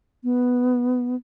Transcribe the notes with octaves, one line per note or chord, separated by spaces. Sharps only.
B3